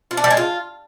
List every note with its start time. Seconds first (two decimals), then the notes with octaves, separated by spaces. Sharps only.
0.11 F4
0.17 D4
0.24 G3
0.30 G#3
0.37 F4